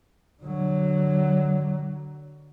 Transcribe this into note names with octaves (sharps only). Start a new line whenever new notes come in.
D3 F#3